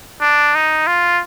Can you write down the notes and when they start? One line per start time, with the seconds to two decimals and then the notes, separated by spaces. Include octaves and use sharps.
0.21 D4
0.55 D#4
0.87 F4